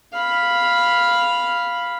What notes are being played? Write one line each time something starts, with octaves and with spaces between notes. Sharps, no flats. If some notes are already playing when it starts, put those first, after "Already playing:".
F5 B5